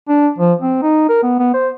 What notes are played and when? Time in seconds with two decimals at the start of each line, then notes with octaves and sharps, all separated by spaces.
0.08 D4
0.38 F3
0.61 C4
0.82 D#4
1.09 A#4
1.23 B3
1.39 B3
1.54 C5